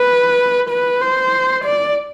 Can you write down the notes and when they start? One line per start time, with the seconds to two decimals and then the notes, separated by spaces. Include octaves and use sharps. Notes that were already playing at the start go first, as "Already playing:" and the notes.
Already playing: B4
0.69 B4
1.01 C5
1.64 D5